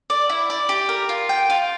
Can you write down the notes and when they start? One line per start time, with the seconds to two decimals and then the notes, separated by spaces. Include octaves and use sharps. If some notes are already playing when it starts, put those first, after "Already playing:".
0.10 D5
0.30 E4
0.50 D5
0.69 G4
0.89 A#4
1.09 F4
1.29 G5
1.50 F4